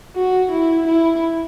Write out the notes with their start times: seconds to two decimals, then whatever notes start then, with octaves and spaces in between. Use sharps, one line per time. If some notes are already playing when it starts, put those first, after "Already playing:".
0.16 F#4
0.52 E4
0.87 E4